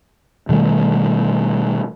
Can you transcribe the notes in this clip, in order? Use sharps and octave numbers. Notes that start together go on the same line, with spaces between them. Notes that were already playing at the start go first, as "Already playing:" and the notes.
B2 D#3 G3 A3